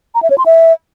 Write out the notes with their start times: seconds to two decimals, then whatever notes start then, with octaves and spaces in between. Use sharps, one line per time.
0.15 A#5
0.22 E5
0.30 C#5
0.38 C6
0.46 E5